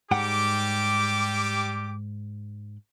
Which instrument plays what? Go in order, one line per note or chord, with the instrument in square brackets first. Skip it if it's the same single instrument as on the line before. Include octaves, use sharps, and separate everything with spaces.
[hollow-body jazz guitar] G#2 F#5 G5 [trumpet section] G3 G4 D6